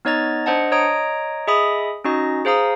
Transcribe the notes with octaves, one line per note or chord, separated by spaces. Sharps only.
B3 D#4 C#5 D#5 A#5 A6
D4 C5 D#5 F#5 A5
C#5 D#5 A#5 D#6 D7
G#4 D#5 E5 B5 D#6
C#4 D#4 F#4 D#5 A#6
G#4 C5 F5 A#5 D#6